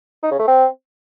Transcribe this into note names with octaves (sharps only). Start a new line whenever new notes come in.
D#4
C#3
A3
C4